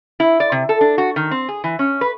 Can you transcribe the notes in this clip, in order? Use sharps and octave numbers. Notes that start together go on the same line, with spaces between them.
E4
D5
C3
A4
D4
F#4
D#3
C4
G#4
E3
C#4
B4